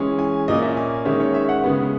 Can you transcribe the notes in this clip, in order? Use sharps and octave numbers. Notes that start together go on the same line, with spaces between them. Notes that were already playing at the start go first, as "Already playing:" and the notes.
Already playing: E3 G#3 C#4
G#5
A#2 A#3 C#4 D#5
E5
G#5
D#3 G#3 C#4 E5
C#5
E5
F#5
C#3 G#3 B3